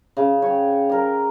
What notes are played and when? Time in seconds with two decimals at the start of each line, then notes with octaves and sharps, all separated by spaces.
0.17 C#3
0.42 C#5 G5
0.89 A#4 D5